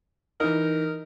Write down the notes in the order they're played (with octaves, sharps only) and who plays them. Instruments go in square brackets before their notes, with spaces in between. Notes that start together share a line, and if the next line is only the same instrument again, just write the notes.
[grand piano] E3 D#4 [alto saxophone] A#4